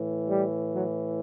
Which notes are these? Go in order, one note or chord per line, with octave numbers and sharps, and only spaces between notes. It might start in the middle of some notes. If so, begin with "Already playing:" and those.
Already playing: A2 E3
G3
F#3